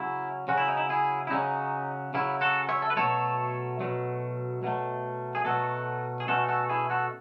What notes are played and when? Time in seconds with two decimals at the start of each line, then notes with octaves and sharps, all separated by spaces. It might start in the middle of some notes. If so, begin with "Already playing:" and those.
Already playing: C#3 F#3 C#4 E4
0.48 C#3 F#3 C#4 F#4
0.57 E4
0.68 D#4
0.77 E4
0.89 E4 G#4
1.27 E4
1.30 C#3 F#3 C#4 D#4
2.14 C#3 F#3 C#4 E4
2.41 F#4 A4
2.69 C#5 E5
2.82 A4
2.90 B4
2.97 B2 F#3 A3 A4 C#5
3.80 B2 F#3 A3
4.63 B2 F#3 A3
5.35 G#4
5.45 B2 F#3 A3 F#4 A4
6.20 G#4
6.28 B2 A3 C#4 F#4 A4
6.48 F#4 A4
6.70 E4 G#4
6.90 F#4 A4